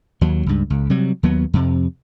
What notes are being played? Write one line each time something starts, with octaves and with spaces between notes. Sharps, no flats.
D#2 F#3
C#2 G2
C#2
C3 F#3 G3
D#2 F#3 B3
F2 C3